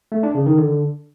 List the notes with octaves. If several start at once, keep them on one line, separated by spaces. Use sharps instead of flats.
A3
D4
C#3
D#3
D3